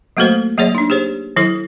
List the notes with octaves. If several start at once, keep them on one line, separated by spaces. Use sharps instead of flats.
F#3 A3 A#3 F#4 A4 C5
F#3 A#3 G#4 C#5 D5 E5
D4 D#4
G4 G#4 C5 C#5
D#3 F#3 E4 A4